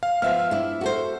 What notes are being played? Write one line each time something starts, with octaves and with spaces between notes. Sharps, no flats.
F5
F3 B3 E5 F6
D4 E4
F#4 A4 C5